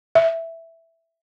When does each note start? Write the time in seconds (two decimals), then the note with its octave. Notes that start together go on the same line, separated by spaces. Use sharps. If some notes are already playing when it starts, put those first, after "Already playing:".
0.15 E5